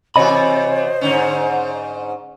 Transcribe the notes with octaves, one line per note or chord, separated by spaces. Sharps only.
C3 E3 F#4 C5 C#5 D#5 B5
G#2 D3 C#4